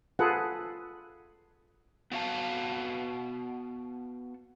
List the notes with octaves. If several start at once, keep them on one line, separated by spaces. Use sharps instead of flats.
F4 G#4 A4 B4 F#5
B3 F#4 F5 A5